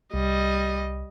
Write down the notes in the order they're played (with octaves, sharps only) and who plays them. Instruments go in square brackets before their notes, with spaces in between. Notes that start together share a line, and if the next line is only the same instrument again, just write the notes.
[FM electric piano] C2 [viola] G3 D#5